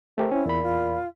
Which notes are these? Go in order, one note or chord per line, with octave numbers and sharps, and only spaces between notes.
A3 C4 G4 A#4
C#4 E4
E2 A#2 B5
F4